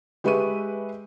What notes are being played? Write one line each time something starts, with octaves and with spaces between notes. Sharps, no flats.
G#3 G4 B4 E5 C#6 D#7